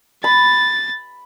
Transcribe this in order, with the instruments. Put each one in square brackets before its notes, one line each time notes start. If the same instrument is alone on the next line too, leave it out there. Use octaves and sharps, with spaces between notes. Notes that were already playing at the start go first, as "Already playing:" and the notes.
[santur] B5 [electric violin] A6